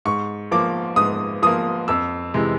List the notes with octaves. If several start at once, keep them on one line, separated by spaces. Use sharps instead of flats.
G#2 C#6
F3 A#3 D6
G#2 D#6
F3 A#3 D#6
F2 E6
C3 E3 G#3